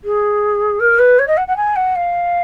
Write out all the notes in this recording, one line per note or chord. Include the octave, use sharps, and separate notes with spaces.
G#4
A#4
B4
C#5
D#5
F#5
F#5
G#5
F#5
F5